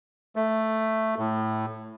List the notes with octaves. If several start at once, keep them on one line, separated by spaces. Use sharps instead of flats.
A3
A2